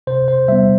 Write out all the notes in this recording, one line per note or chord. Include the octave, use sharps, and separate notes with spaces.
C3 C5
C5
G3 B3 E5